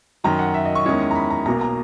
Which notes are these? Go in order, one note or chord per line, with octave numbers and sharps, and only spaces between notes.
F#2 D#3 F#3 A#5
F#5
E5
D#5
C#6
E2 D#3 G#3 C#4 E4
A#5
B5
A#5
B1 B2 A#3 A#5
A#5